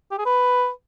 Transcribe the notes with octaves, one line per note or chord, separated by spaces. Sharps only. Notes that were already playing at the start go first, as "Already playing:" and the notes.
G4
G#4
B4